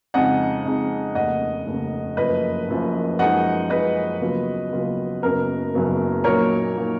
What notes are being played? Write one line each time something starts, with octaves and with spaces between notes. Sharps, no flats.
F2 C#3 G#3 D#4 D#5 F#5
F2 C#3 G#3 D#4
F1 D#2 C#3 D#5 F#5
F1 D#2 C#3
F#1 F#2 F3 B4 D#5
F#1 F#2 F3
F#2 F3 G#3 D#4 D#5 F#5
F#2 F3 G#3 D#4 B4 D#5
D#2 C#3 F#3 B3 F4
D#2 C#3 F#3 B3 F4
F#1 F#2 C#3 F#3 B3 A#4
F#1 F#2 C#3 F#3 B3
A#2 F#3 A#3 D#4 A#4 C#5
A#2 F#3 A#3 D#4